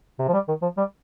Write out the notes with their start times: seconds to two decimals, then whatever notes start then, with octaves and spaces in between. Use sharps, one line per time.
0.19 C3
0.28 F3
0.34 G3
0.48 D#3
0.62 F3
0.77 G3